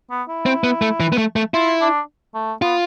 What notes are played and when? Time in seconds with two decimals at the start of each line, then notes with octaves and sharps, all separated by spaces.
0.10 B3
0.28 E4
0.46 C4
0.64 B3
0.82 A3
1.00 E3
1.12 B3
1.18 A3
1.36 A3
1.54 E4 F4
1.81 D4
2.34 A3
2.62 B3 F4